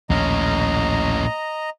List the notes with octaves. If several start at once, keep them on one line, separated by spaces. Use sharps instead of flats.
A#1 D#2 A2 C#4 D#5 A#5